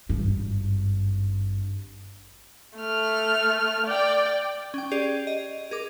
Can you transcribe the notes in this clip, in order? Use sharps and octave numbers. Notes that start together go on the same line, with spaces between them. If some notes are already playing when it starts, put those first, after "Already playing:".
G#1 G2
A3 F6
D5 G5
C#4 G5
G4 G#4 D5 C7 F7
D#5
G#4 A#4 D6